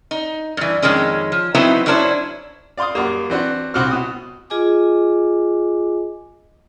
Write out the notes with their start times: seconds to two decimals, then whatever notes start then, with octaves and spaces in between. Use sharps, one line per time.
0.11 D#4
0.57 G2 E3
0.82 F2 D#3 G#3 C#4
1.32 F3
1.55 F#3 B3 C4 D#4 E4
1.86 F#2 F#3 C#4 D4 E4 C5
2.78 D5 F5 C6 D6 D#6
2.95 F#2 G3 A#3
3.30 E3 C4 D4 F#4
3.74 C2 C4 F#4 D6 F6
3.91 B2 D#6
4.50 F4 G#4 D#5 G#5 D6